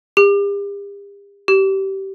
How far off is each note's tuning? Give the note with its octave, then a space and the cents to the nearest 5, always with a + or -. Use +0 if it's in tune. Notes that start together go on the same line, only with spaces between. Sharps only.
G4 +40
G4 -20